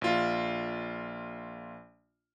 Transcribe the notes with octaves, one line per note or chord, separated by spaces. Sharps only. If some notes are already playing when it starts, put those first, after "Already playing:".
A#1 F4